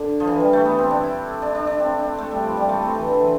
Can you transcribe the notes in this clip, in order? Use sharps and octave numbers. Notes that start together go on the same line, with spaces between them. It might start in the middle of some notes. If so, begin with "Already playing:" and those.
Already playing: D3
F3
E3
G3
A3
B3
C4
D4
E4
D4
D4
D4
C4
D4
A3
G3
F3
G3
A3
C4
E3
D3
E3